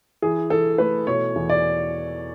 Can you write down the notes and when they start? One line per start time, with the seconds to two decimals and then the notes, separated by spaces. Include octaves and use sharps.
0.22 E3 G#4
0.50 E3 A4
0.78 A3 B4
1.07 B2 C#5
1.36 E2
1.50 D5